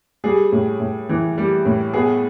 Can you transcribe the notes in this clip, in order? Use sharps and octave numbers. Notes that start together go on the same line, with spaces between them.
G3 G#4
A2
A2
E3
G3
A2
B3 G#4